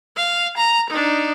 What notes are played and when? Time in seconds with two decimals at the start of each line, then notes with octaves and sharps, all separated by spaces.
0.16 F5
0.57 A#5
0.90 D4 D#4